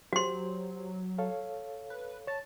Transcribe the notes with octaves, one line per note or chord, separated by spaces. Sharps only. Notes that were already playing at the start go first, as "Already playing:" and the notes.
F#3 F#4 G4 C5 C6
A4 C#5 F5
B4
C#5 A5 A6